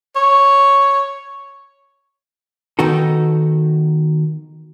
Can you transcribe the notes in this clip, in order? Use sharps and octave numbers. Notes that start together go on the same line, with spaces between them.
C#5
D#3 B3 D#4 F#4 A4